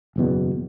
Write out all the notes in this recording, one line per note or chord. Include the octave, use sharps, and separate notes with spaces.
F#1 E2 B2